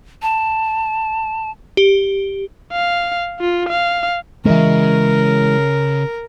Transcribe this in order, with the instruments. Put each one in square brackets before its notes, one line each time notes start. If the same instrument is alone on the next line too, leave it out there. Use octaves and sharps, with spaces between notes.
[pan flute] A5
[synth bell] G4
[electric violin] F5
F4
F5
[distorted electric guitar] C#3 [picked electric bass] E3 G#3 [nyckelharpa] A#4